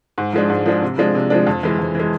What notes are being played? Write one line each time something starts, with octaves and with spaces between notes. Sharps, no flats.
G#2
F3 G#3 D4
G#2
F3 G#3 D4
C3
F3 G#3 D4
C3
F3 G#3 D4
F2
E3 G#3
F2
E3 G#3